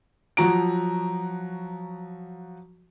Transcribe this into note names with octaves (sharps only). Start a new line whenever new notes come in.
F3 F#3 F#4 A#5 D7